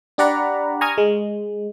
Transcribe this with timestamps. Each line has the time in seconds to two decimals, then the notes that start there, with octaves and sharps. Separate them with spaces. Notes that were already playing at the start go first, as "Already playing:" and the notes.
0.18 D4 G4 D5 F#5 A#5 B5
0.81 G#5 A#5 C#6 D#6 F6 G#6
0.98 G#3